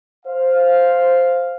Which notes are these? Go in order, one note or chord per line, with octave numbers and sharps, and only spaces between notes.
C5 F5